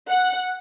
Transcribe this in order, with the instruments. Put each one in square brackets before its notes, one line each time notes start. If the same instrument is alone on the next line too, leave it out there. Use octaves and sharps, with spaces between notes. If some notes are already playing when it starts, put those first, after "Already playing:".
[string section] F#5